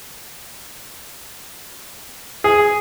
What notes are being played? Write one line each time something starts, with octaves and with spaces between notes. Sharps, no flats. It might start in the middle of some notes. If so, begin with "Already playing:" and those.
G#4